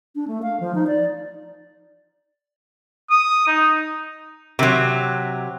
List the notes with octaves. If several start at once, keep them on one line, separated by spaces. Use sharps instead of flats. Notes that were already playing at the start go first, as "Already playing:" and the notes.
D4
A3
F5
F3
D#4
D5
D#6
D#4
C3 F#3